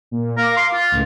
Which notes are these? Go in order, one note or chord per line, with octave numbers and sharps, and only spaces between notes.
A#2
A#4 F5 D6
C6
F4
C#2 A2